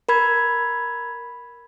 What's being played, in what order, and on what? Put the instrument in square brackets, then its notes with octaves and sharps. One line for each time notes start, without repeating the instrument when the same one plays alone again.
[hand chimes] A#4 B5 G#6